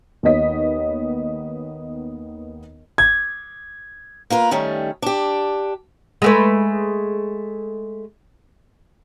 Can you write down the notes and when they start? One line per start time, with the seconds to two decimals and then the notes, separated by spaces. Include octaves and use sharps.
0.23 D#2 B3 D#4 C#5 D#5 B6
2.98 G#6
4.30 A#3 F4 A#4 B4
4.51 D#3 G3 A3 C#4
5.02 D4 G4
6.22 G#3 A3 B4